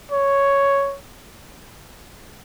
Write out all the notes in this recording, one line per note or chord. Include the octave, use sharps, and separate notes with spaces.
C#5